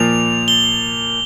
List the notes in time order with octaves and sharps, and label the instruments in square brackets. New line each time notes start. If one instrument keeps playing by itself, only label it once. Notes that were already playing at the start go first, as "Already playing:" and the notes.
Already playing: [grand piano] A#2 F3 A#3 [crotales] F7
[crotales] G7